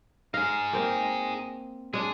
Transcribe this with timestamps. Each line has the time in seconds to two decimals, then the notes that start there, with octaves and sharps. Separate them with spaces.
0.34 D#4 G#4 F5
0.73 A#3 C4
1.93 G#3 D4 G#4